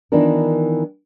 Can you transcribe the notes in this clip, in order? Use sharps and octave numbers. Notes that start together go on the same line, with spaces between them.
D#3 E3 B3 D4 F4 A#4